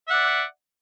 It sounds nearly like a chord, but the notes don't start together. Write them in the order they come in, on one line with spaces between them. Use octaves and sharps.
E5 F#5 D5